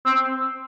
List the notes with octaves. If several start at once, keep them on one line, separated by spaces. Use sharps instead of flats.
C4